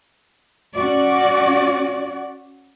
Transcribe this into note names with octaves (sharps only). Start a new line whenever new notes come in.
C#4 F#4 D5